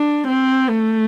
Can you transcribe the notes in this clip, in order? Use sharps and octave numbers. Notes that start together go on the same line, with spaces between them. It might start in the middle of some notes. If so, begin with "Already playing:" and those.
Already playing: D4
C4
A3